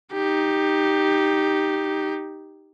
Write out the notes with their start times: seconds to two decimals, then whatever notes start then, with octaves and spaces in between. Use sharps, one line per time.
0.12 D#4 G4